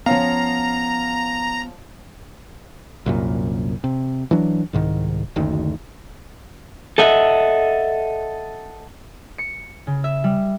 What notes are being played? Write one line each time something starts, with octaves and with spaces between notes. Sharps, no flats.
F3 B3 C#4 F5 A#5
C2 F#2 A#2
C3
E3 F#3 D4
C2 G#2 D#3
F#1 D2 D#3
A4 D#5 E5 F#5
C#7
C#3
E5
G3